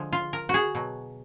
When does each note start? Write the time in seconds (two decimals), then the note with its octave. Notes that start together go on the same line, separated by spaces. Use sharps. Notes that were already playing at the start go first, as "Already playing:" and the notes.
Already playing: D3 F3 G#3
0.13 F4
0.33 A#4
0.49 F#4 G#4
0.75 B2 F#3